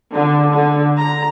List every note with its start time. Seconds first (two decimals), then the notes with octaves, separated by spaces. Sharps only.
0.14 D3
0.52 D3
0.98 A#5